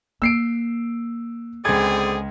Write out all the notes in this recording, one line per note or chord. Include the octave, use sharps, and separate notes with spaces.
A#3 E6 C7 D7
C#2 D3 C4 G#4 G#6